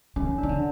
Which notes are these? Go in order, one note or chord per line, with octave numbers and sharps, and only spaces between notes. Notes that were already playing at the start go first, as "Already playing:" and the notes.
D#3 C#4
D4
D#3
D3